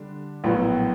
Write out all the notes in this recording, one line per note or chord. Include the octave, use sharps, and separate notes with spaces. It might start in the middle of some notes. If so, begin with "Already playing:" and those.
Already playing: D3 G3 D4
A#1 A2 F#3 B3